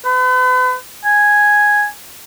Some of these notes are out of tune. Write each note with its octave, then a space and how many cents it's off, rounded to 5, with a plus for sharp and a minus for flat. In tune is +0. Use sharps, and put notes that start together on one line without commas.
B4 +40
G#5 +0